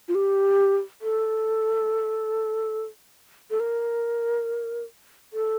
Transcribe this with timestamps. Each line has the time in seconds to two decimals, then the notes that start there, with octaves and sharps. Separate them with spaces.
0.08 F4
0.15 G4
1.02 A4
3.51 A4
3.60 A#4
5.33 A4